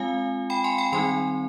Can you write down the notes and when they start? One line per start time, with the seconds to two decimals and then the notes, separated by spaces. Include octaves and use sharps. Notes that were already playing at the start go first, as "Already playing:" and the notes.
Already playing: G#3 C4 F4 F5 G#5
0.50 G5 B5
0.64 G#5 C6
0.78 G5 B5
0.92 D#3 G3 C4 D#4 G#5 C6